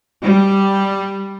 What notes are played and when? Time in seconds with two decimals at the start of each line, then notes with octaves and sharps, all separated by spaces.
0.22 G3